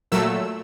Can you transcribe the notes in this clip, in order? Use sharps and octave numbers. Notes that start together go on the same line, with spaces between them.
A#2 F#3 A3 E6